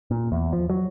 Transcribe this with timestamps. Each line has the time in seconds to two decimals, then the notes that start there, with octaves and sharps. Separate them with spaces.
0.11 A#2
0.32 E2
0.53 F3
0.70 F#3